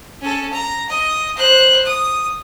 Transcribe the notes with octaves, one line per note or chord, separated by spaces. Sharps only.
C#4 A4
A#5
D#5
C5 F#6
D#6